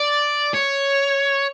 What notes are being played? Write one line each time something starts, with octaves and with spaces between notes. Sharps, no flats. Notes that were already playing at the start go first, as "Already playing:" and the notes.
Already playing: D5
C#5